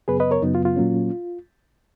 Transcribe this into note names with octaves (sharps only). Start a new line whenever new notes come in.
F#2 C#3 F#3 B3 G#4 B4
B4 D#5
A#4 C#5
F#2 C#3 F#3 B3 D#4
F4
F4
A#2 F#3 A#3 C#4